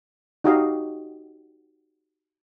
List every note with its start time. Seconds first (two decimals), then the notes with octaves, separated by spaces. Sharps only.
0.44 D#4 F#4 G4 D#5 F5